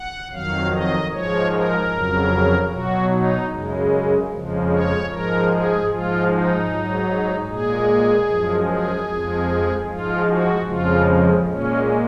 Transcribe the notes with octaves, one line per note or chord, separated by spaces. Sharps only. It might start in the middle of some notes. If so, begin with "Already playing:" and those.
Already playing: F#5
F2 D#3 F#3 F5
D#5
G#2 F3 G#3 C#5
A#4
F2 C#3 F#3
B2 F#3 F#4
D#4
F#2 C#3 G#3
F2 C#3 F3 G#3
C#5
G#2 F3 G#3 A#4
G#4
G#2 F3 G#3 F4
D#4
G#2 F#3
A#2 G#3 G#4
F#2 F3 G#3
G#4
F2 F3 G#3
G#2 F3 G#3 F4
F#4
F2 C#3 F3 G#3 F4
A#2 G#3 C#4